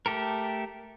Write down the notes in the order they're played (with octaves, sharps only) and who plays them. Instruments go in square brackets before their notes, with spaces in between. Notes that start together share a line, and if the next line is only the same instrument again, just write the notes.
[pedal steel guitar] A3 G4 A4 A#4